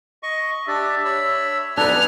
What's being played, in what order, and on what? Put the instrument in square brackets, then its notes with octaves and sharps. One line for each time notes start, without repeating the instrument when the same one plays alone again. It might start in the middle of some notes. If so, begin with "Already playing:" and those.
[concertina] D#5 C#6
[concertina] D4 G4 D5 [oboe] E5
[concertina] C#5 B5 E6
[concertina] B3 D#4 A4 [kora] D4 B4 [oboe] G#5 [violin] F6